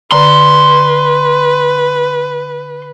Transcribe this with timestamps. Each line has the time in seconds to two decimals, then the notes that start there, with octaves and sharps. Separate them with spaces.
0.12 D3 B4 D5 A#5 C6